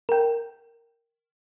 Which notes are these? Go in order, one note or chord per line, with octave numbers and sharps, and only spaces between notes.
A#4 G5